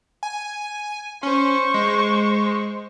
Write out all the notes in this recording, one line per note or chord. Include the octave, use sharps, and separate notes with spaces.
G#5
C#4 C5 C#6
G#3